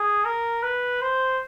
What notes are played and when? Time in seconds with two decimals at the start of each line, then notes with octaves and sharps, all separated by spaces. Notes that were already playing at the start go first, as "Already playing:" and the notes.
Already playing: G#4
0.25 A#4
0.63 B4
1.02 C5